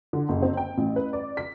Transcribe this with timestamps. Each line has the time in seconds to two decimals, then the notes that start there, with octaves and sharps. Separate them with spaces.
0.13 D3
0.29 F#1
0.42 C4
0.57 G5
0.78 A1
0.96 B4
1.13 D5
1.37 B6